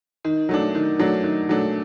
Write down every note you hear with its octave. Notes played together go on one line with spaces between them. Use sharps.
D#3
F#3 A3 D4
D#3
F#3 A3 D4
D#3
F#3 A3 D4